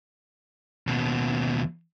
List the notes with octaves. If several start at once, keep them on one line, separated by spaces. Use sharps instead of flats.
D#2 B2